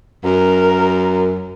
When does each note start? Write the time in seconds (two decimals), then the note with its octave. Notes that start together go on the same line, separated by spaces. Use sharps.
0.24 F#2 A#4